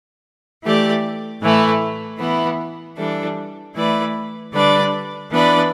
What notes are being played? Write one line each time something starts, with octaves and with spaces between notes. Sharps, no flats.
E3 A3 G4 D5
A2 E3 A3 E4
E3 B3 E4
E3 G3 D4 A4
E3 A3 E4 B4 D5
D3 G3 D4 B4 D5
E3 B3 D4 B4 D5